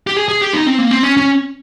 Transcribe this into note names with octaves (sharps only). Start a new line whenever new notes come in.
G4
G#4
G#4
G4
D#4
C4
A#3
C4
C#4
C#4